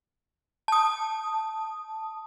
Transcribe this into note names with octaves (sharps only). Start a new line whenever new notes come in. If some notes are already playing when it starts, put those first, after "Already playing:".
A5 D#6